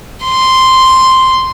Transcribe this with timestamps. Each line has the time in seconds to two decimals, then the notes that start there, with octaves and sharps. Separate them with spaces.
0.24 C6